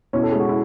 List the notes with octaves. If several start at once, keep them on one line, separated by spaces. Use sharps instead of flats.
B2 C#4 E4
A4
G#4
G#3 F#4
E4